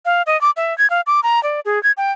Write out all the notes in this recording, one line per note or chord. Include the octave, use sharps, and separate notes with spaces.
F5
D#5
D6
E5
G#6
F5
D6
A#5
D5
G#4
G#6
G5